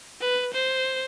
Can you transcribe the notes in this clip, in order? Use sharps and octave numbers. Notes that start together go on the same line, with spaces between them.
B4
C5